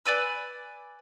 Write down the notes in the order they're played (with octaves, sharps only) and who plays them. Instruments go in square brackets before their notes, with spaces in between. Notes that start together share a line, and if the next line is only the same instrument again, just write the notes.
[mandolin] B4 D5 G#5 E6